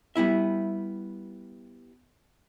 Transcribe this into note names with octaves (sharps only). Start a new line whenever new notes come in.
G3 B3 E4 E5